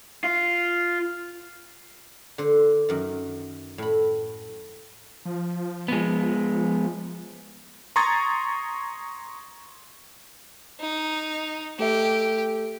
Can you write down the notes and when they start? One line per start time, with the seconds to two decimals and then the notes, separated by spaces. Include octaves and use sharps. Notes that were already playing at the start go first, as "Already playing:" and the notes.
0.24 F4
2.38 D3 C5
2.89 F#2 D#3
3.78 A2 B5
5.25 F3
5.88 G#3 B3
7.96 A#5 C6 C#6 D#6 G#6 A6
10.80 D#4
11.79 A3 G4 A4 E5